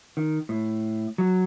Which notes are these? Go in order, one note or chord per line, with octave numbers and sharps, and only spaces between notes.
D#3
A2
F#3